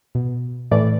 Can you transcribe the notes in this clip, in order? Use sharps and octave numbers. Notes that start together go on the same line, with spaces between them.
B2
A2 E3 D5